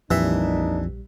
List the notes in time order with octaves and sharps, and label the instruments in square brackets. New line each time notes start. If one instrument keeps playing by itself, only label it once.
[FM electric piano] A#1 G3 [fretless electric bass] F2 [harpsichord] E3 E5 [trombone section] A#3 D4 D#4